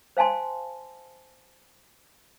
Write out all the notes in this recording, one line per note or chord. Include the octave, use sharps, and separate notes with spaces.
C5 F5 G#5 A5 C6